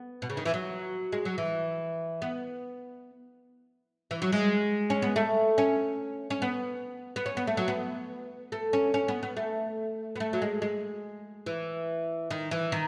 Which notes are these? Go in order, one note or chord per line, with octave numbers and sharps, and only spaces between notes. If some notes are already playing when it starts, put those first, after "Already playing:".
Already playing: B3
B2
C#3
D#3
E3
F#3
G#3
F#3
E3
B3
E3
F#3
G#3
C#4
B3
A3
C#4
C#4
B3
B3
C#4
B3
A3
F#3
B3
A3
C#4
C#4
B3
B3
A3
B3
A3
F#3
G#3
G#3
E3
D#3
E3
D#3